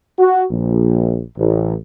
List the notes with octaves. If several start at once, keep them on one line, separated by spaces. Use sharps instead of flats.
F#4
A#1
A1